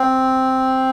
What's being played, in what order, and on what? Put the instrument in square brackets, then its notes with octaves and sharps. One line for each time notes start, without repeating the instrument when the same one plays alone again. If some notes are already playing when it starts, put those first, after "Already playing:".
Already playing: [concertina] C4